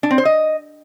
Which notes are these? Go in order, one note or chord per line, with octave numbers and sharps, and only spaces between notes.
D4
C4
C5
D#5